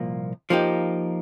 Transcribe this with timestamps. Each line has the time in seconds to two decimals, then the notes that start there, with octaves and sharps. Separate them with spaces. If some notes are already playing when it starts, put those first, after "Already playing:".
Already playing: C2 A#2 F3 A#3
0.50 F3 A#3 D#4 G4